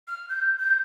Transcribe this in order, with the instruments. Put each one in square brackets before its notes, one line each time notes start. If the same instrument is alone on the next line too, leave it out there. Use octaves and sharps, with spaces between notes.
[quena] F6
G6
G6